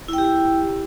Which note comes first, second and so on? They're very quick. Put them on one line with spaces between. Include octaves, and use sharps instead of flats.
E4 G5 G4